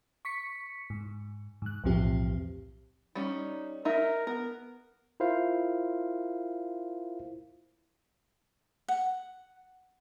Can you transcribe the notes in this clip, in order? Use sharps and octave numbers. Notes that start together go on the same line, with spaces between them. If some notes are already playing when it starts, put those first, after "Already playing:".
C#6 B6 C#7
G#2
G#2 F#6
B1 E2 A2 F3 C4 G4
G3 C#4 D#4
D#4 A#4 E5
B3 A#4
E4 F4 A#4 C5 F5
F#5